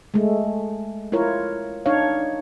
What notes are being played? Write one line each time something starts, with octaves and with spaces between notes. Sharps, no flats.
G#3 A3
E4 F4 A#4 C#5
D4 D#4 C#5 F5